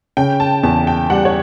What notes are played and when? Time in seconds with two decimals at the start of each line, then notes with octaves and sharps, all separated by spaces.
0.17 C#3 G5
0.40 A5
0.63 E2 A5
0.87 G5
1.10 G3 F#5
1.25 C#5